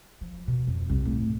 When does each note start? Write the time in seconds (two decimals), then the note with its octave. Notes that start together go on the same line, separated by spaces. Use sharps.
0.21 F3
0.48 B2
0.67 F2
0.89 C2
1.06 A2